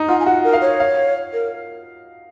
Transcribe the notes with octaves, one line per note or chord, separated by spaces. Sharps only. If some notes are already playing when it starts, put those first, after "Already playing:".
Already playing: D#4
F4 F#5
G#5
F#4 F#5
A#4
F5
C#5
F5
A#4